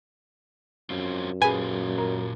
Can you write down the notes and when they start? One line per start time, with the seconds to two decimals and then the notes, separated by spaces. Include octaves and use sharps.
0.90 F#2 C4 C#4 F4
1.42 A#2 F4 G4 G#4 B4 G#5
1.98 A#4